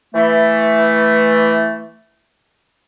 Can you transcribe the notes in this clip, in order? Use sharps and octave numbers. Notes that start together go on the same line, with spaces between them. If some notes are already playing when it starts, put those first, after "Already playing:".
E3 A3